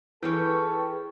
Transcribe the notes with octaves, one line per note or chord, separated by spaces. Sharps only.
E3 C#4 G#4 A4 B4 C#5 G5 A5